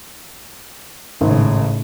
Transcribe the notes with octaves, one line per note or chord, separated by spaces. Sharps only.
G#1 A2 C#3